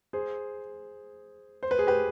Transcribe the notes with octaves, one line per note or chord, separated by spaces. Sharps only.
G#4 C5
C5
B4
G#4
G4 B4